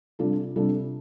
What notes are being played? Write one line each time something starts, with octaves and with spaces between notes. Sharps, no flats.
C3 G3 D4 F4 A4
C3 G3 D4 F4 A4